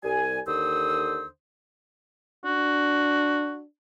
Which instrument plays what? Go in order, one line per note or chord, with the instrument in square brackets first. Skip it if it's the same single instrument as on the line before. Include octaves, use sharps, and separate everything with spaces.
[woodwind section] C2 G3 G#5
D#2 D3 C5 D#6 E6
[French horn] D4 [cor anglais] F#4